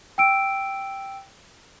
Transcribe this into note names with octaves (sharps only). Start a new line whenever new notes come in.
G5 E6 D7